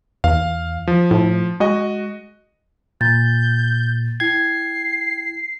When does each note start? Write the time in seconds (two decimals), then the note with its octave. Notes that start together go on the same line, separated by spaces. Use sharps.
0.24 E2 F5
0.87 F3
1.11 A2
1.60 G#3 F#4 D#5
3.01 A#2 G6 A6
4.20 E4 G5 G#6 C7